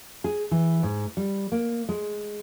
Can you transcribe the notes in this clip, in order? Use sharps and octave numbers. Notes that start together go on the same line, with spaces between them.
G#4
E3
G#2
G3
A#3
G#3